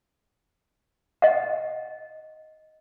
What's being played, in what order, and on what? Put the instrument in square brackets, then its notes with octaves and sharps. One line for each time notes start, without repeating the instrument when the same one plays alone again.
[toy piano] D#5 F#5